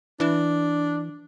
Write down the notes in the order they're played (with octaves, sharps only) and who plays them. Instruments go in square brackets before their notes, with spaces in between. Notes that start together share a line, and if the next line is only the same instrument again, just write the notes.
[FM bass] E3 [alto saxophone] D4